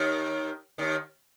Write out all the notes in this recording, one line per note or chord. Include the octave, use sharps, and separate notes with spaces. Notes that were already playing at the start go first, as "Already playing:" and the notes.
Already playing: D#2 D#3
D#2 D#3